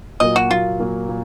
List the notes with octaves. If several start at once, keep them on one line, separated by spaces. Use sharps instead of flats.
A#2 F#3 A#3 D#5
F#4
A#2 F#3 A#3 F4
A#2 F#3 A#3
A#2